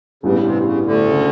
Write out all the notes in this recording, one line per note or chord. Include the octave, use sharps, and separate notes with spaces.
A1 G2 C#3 E3 G3 B3
C3
C#3
D2 D3
C#3